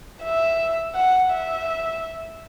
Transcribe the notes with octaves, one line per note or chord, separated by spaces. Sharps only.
E5
F#5
E5